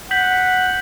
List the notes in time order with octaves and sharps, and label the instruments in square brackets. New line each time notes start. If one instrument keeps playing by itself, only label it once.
[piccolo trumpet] F#5 [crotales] G6 B6 F#7